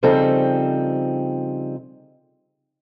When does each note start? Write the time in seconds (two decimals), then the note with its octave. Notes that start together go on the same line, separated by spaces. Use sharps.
0.03 C#3 F3 G3 C4 D#4 A4